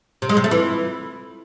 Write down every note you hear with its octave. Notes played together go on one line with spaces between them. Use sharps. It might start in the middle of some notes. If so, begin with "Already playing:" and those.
C3
G#3
C3
A3
E3